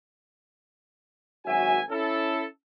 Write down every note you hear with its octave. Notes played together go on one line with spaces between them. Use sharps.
G#1 F#2 F#4 E5 G#5
C#4 E4 A4